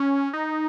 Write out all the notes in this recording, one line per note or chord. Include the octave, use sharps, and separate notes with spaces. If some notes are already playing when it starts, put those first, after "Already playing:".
Already playing: C#4
D#4